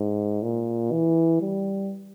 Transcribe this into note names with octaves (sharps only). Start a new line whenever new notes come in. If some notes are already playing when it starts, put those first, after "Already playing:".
Already playing: G#2
A#2
E3
G3